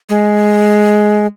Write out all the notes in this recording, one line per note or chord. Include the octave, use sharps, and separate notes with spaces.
G#3